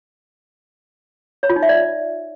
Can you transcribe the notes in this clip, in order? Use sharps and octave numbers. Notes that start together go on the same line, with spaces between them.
C#5
F4
D#4
E5
D5